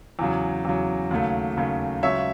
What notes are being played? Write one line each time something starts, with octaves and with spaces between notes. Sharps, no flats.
E2 C#3 F#3
E2 C#3 F#3
D#2 C#3 F#3 A3
D#2 C#3 F#3 A3
C#2 C#3 F#3 C#5 E5